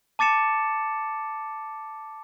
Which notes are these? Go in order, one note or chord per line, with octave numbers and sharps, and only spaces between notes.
A5 D6 A6 C#7 E7